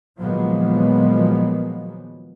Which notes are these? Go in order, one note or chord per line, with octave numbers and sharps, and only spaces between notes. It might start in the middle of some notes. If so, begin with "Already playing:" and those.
A#2 D#3 F3 F#3 G#3 B3